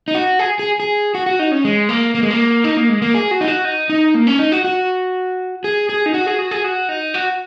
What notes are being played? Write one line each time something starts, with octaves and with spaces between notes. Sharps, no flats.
D#4
F#4
G#4
G#4
G#4
F#4
F#4
D#4
C#4
G#3
A#3
A#3
G#3
A#3
D#4
A#3
G#3
A#3
G#4
F#4
D#4
F#4
D#4
D#4
A#3
C#4
D#4
F#4
F#4
G#4
G#4
D#4
F#4
G#4
F#4
G#4
F#4
D#4
F#4